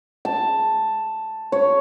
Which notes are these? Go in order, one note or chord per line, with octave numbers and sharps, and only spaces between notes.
A5
C#5